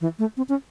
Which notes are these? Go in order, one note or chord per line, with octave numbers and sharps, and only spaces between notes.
E3
A3
C4
C#4